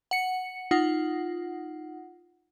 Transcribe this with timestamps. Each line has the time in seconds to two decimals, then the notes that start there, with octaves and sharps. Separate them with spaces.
0.11 F#5 C#7
0.71 D#4 F4 F#5